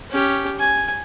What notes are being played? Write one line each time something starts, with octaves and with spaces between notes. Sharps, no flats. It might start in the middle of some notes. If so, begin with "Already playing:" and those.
C#4 G4
G#5